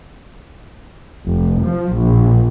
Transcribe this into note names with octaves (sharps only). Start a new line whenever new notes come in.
F1
F3
A#1